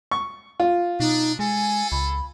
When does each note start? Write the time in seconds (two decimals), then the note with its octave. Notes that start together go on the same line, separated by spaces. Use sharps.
0.11 C#6
0.60 F4
1.00 B2 D4 D#4
1.39 G#3 G#4 A4 G#5
1.92 C#2 B5